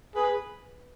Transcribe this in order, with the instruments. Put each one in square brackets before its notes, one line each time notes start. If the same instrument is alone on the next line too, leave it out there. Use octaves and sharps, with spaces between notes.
[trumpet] G#4 [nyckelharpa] B4